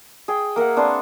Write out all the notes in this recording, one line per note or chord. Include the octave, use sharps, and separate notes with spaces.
G#4 G5
A#3 A#4 E5 F#5
C4 D4 B4 C5